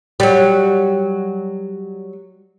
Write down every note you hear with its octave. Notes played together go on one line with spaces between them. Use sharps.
F#3 G3